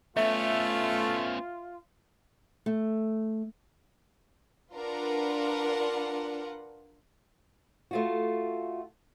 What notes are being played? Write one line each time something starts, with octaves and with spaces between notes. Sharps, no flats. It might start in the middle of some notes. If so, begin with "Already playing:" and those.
A3 B3 C#4 F4 E5
A3
D4 F4 A#4 B4 F#5
A3 F4 F#4